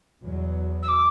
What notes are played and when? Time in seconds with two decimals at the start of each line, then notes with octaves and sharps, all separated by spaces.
0.22 E2 B2 F#3
0.82 E6
0.88 D6